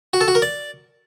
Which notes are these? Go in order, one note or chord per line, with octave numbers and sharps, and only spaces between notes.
F#4
A4
F#4
A#4
D5